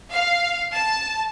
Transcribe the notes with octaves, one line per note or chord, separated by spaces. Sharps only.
F5
A5